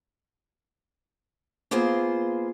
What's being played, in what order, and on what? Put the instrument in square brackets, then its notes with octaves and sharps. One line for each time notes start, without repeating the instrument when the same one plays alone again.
[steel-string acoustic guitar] A#3 B3 F4 G#4 C5